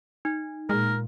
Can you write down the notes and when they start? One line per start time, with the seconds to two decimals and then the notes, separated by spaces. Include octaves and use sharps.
0.25 D#4
0.69 A#2 G#3 A#4